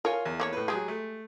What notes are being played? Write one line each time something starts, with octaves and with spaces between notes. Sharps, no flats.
F4 A#4 C#5 G#5
E2
A#3 C4 C#5
A2 B4
F#3 G#3 G4 G#4
A3